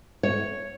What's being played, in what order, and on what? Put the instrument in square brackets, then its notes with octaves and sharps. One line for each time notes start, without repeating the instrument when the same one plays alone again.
[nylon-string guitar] C#5